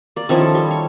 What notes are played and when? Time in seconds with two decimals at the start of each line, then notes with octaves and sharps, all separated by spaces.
0.16 A#3 D5
0.29 D#3 F3 C#4 E4
0.41 A4
0.55 G3
0.70 C#5